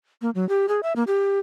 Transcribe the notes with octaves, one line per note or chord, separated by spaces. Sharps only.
A#3
F#3
G4
G#4
E5
A#3
G4